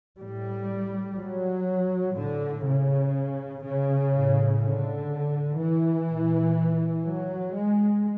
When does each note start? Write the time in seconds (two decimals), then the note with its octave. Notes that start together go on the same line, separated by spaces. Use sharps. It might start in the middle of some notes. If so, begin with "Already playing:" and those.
0.20 A2 G3
1.18 F#3
2.17 A2 D3
2.65 C#3
3.64 C#3
4.13 A2
4.61 D3
5.60 E3
6.08 A#2
7.06 F#3
7.55 G#3